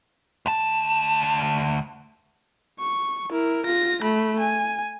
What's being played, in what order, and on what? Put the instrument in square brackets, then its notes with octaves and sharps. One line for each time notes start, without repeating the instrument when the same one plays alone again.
[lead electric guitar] D2 A5
[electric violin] C#6
E4 A#4
F4 A#6
A3 B5
G#5